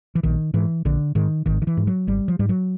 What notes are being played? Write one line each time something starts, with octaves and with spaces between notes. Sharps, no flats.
E3
A#1 D#3
G#2 E3
A#1 D3
G#2 D#3
G#1 D#3
D#3
E3
G#2
F#3
G#1 G3
F3
G#2 G3
F#3